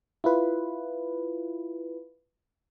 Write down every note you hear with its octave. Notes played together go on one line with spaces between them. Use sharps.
E4 F4 B4